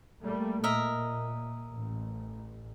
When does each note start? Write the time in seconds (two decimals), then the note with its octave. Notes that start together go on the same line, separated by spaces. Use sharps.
0.24 G3 A3 A#3
0.64 A#2 A#4 D#5 E5
1.69 A1